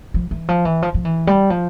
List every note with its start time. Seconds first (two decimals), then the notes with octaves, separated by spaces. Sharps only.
0.14 F3
0.31 E3
0.49 F3
0.65 E3
0.82 F3
0.94 F3
1.05 E3
1.27 G3
1.50 F3